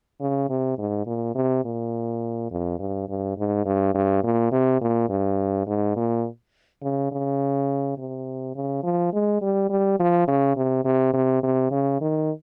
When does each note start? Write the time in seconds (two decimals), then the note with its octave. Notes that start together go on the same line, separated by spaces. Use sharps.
0.21 C#3
0.49 C3
0.78 G#2
1.06 A#2
1.35 C3
1.65 A#2
2.51 F2
2.79 G2
3.09 G2
3.37 G#2
3.65 G2
3.94 G2
4.24 A#2
4.52 C3
4.81 A#2
5.09 G2
5.67 G#2
5.96 A#2
6.82 C#3
7.12 C#3
7.98 C3
8.55 C#3
8.83 F3
9.13 G#3
9.41 G3
9.69 G3
9.99 F3
10.28 C#3
10.57 C3
10.85 C3
11.13 C3
11.43 C3
11.71 C#3
12.01 D#3